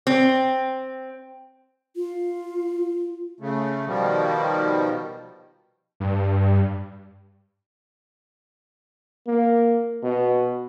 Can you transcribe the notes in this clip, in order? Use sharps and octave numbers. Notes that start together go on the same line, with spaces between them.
C4
F4
C#3 A3
B2 D#3 F3 G3
G2
A#3
B2